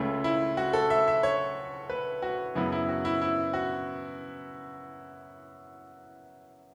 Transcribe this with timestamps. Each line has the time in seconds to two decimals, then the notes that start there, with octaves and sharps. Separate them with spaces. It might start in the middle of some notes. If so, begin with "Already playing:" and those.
Already playing: C#2 C#3 A3
0.24 E4
0.57 F#4
0.73 A4
0.90 E5
1.08 E5
1.23 C#5
1.90 B4
2.22 F#4
2.55 F#2 C#3 F#3 B3 E4
2.72 E4
2.89 F#4
3.05 E4
3.22 E4
3.53 F#4